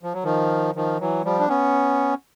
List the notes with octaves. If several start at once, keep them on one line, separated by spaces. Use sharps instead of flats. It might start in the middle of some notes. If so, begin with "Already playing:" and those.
F3
F#3
D#3 F3
D#3 F3
E3 F#3
F3 G3
D4
B3 C#4